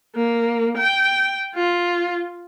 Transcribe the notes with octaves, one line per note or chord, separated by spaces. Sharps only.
A#3
G5
F4